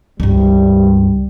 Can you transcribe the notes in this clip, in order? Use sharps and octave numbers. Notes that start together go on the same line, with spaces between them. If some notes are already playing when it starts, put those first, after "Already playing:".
C#2 G2 G3